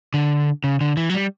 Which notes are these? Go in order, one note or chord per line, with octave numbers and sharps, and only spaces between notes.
D3
C#3
D3
E3
F#3
G3